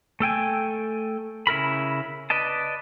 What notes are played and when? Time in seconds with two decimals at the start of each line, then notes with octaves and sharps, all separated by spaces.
0.20 A3 A4 G5 G#5
1.47 C#3 E4 A#4 B5
2.30 B4 D5 D#5 A5